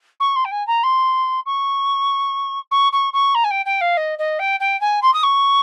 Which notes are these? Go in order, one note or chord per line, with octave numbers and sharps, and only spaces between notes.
C#6
C6
G5
G#5
A#5
C6
C#6
C#6
C#6
C#6
A#5
G#5
G5
G5
F5
D#5
D#5
G5
G5
G#5
C6
D#6
C#6